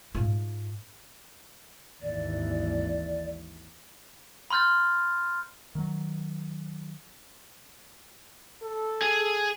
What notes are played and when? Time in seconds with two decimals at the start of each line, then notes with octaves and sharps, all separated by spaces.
0.15 G#2 F4
2.02 G#1 D#2 E3 D5
4.50 B5 C6 F6 G6 A6
5.75 D#3 F#3
8.62 A4
9.02 G#4 G#5